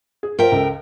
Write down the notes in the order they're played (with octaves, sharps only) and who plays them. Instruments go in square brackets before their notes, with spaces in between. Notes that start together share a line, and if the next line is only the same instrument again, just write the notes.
[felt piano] G#4
[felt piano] F4 C5 [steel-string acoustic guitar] A#4 E5 G5
[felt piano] C#2 A4